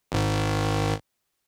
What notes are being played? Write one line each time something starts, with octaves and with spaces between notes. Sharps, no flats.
G#1 G#2 D#3